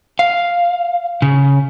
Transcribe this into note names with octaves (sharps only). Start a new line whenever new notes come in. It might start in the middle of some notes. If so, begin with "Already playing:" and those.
F5
C#3